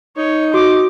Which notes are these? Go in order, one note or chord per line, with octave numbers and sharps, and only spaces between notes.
D#4 C#5
F#4 D6